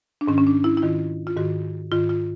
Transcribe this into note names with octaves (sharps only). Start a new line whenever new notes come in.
D4
G#2 D#3 C#4
C#4
D4
E4
E4
G#2 D#3 F4
F4
G#2 D#3 F#4
G#2 D#3 F4
F4